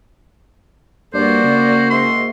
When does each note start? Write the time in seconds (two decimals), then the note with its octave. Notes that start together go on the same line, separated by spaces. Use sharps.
1.14 G2 A#3 F#4 C5 D5
1.44 C#3
1.90 G#2 E5 C6